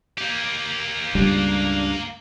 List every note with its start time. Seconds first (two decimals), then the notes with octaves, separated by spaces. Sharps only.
0.18 A#3 G4
1.15 C#2 G2 G3 D4